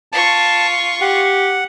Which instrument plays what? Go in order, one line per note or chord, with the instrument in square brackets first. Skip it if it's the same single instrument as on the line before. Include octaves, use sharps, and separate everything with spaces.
[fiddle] F4 C#6 [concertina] A5
[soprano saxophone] G4 [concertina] F#5